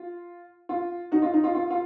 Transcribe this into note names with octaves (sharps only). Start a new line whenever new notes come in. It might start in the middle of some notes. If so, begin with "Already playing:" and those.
Already playing: F4
F4
D#4 F#4
F4
D#4
F4
F4
F4